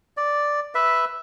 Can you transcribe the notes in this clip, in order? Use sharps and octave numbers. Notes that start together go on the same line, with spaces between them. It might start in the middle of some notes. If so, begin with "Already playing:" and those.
D5
B4 E5